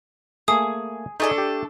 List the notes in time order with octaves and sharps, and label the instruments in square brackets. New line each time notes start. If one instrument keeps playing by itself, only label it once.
[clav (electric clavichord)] A3 A#3 [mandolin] G#4 [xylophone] D#6
[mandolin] A3 D4 A4 [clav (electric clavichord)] D#4 G#4
[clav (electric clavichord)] G4